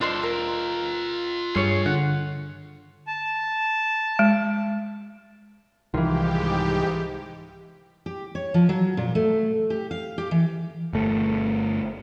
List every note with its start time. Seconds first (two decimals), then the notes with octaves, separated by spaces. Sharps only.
0.01 D4 F4 C5 D#5 C6
0.23 A#4
1.55 G2 G#4 C#5 C7
1.86 D3 F#5
3.07 A5
4.19 G#3
5.94 C2 G#2 D#3 E3 F4 G4
8.06 G4
8.35 C#5
8.54 F3
8.69 F#3
8.97 A#2
9.15 A3
9.70 G4
9.91 F5
10.18 G4
10.31 E3
10.93 G1 A3